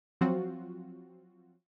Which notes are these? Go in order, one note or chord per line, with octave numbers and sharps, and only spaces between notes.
F3 F#3 C4 F4 F#4